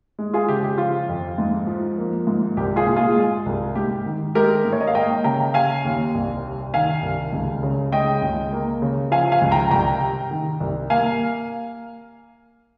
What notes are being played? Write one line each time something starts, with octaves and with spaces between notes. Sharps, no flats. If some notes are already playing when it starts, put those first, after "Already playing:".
G#3
F4 G#4
C#3 G4
G4
F3 F4
F2
G#2
F3
A#3
G#2
C2 G4
F4 G#4
A#2
F4 G#4
G#3
C2
G#2 G4
D#3
G#3 G4 A#4
G#2
C#5
D#5
F5
A#3 D#5 G5
C#3 G5 A#5
G3 F5 G#5
D#2
C2
C3
D#3 F5 G#5
C2
C#2
C#3
G#3 D#5 G5
C#2
A#3
C#3
F3 F5 G#5
F5 G#5
C#2
G5 A#5
C2 G5 A#5
C3
D#3
C2
A#3 F5 G#5